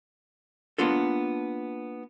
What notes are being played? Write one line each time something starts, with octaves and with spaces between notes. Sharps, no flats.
A#3 B3 D4 F4 A4